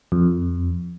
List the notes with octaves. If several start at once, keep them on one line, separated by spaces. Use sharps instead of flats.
F2